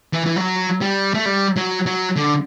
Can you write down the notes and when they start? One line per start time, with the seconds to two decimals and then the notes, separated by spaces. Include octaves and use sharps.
0.13 E3
0.26 E3
0.36 F#3
0.81 G3
1.14 A3
1.26 G3
1.57 F#3
1.86 F#3
2.16 D3